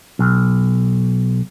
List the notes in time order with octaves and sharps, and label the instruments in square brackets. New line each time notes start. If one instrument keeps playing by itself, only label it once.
[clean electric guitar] B1